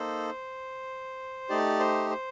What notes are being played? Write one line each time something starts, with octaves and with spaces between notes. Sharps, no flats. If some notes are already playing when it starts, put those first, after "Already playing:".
Already playing: A#3 D#4 A4 C5
A3 D#4 G4 D5
C5
C5